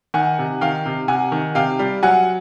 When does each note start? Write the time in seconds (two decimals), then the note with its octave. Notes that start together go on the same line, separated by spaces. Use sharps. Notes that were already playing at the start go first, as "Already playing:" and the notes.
0.14 D#3 F#5 G#5
0.38 C3
0.61 D#3 F5 G5
0.86 C3
1.08 C3 F#5 G#5
1.32 D#3
1.55 C3 F5 G5
1.79 G3
2.03 F#3 F#5 G#5